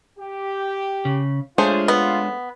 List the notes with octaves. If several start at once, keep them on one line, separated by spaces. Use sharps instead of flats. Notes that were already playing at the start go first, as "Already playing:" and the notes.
G4
C#3
G#3 A3 D4 F4 G#4 C5 C#5
B3